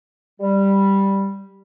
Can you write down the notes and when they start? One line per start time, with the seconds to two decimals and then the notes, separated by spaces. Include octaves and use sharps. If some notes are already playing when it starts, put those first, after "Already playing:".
0.40 G3